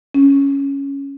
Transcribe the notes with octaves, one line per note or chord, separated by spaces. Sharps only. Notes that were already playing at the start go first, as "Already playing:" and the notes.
C#4